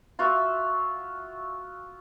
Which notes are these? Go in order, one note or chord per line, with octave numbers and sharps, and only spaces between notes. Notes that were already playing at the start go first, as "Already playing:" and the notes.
F4 F#4 E5